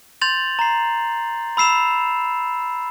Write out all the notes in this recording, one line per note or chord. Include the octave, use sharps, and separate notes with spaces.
C6 G6 A6 F7 F#7
A#5 C7
B5 E6 C7 E7 F7